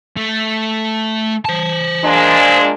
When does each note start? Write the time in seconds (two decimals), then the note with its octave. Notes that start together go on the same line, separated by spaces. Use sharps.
0.17 A3
1.45 C5 A5
2.04 A#2 G#3 D4